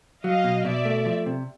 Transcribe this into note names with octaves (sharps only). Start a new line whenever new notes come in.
F#3 D#5 F5
B2
B2 D5 E5
A3
F3
C3